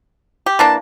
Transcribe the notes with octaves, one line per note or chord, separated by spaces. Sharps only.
G4
E3 A#3 D4 A5